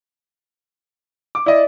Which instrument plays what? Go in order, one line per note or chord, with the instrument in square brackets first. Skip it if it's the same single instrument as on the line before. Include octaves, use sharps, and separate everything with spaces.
[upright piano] D6
[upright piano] E4 D#5 [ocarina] D5